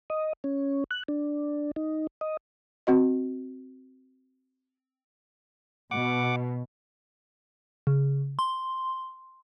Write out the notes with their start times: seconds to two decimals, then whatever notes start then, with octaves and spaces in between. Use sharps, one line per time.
0.10 D#5
0.44 C#4
0.91 F#6
1.08 D4
1.76 D#4
2.21 D#5
2.87 C4 F#4 D#5
5.91 B2 F#5 D6
7.87 C#3
8.39 C6